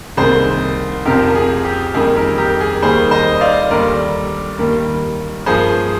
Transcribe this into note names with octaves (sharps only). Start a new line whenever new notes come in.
C2 C3 D#3 A#3 G#4 C5
F2 C3 F3 G4 A#4
A#4
G#4
G4
F2 D#3 G3 A#3 G#4
G4 A#4
G4 A#4
G#4
D#2 D#3 G3 A#3 G#4 C5
C5 D#5
D#5
D5 F5
D#2 D3 G3 A#4 D5
D#2 D#3 G3 A#3
G2 F3 A#3 G#4 C5
G#4